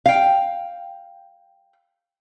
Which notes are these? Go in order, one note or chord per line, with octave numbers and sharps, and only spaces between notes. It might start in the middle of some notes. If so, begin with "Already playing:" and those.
F5 G5